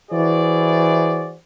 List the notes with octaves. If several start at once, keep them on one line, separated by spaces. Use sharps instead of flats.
E3 E4 F#4 G#4 C5 D5